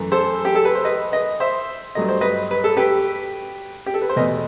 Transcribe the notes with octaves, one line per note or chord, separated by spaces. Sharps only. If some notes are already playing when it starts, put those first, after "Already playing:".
Already playing: F#2 E3 A3
A4 C5
G4
A4
B4
C5
B4 D#5
B4 D#5
C5 E5
G2 F#3 A3 D#5
C5
B4 D#5
B4
A4
G4 B4
G4
A4
B4
C5
E2 B2 A3 B4 D#5